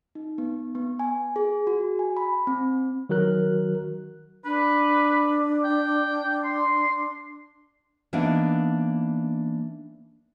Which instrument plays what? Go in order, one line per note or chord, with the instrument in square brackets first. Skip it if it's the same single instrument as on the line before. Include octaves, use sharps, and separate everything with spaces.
[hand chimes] D#4
B3
B3
G#5
G#4
F#4
G#5
B5
C4
[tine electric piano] D#3 F#3 F#4 A#4 F#6
[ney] D4 [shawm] B4
[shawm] G5
C6
[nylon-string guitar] E3 A#3 B3 D4 D#4